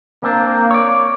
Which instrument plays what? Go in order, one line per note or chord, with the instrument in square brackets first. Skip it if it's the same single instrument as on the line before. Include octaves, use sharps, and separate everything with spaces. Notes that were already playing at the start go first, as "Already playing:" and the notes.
[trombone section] A#3 [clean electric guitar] C4 D4
[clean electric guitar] C#5 D5